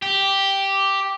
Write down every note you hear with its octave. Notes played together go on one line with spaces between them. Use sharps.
G4